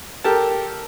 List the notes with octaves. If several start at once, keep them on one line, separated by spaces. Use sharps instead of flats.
G4 A4 A#4 A5